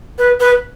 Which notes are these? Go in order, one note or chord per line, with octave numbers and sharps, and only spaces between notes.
B4
B4